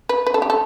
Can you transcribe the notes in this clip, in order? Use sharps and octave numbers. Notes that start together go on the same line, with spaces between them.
B4
B4
A4
G4
A4